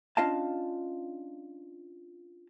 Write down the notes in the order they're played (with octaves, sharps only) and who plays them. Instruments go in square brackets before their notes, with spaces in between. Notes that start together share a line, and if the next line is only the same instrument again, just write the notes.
[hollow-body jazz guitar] C#4 D4 F4 D#5 F5 A5